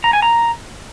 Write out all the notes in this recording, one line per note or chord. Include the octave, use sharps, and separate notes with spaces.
A#5
G#5
A#5